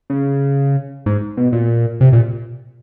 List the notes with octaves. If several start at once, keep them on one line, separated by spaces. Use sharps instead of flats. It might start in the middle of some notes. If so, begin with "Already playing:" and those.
C#3
G#2
B2
A#2
C3
A#2